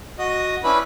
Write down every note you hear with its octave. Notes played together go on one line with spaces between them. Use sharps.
F#4 D#5
C#4 D4 E4 B4 B5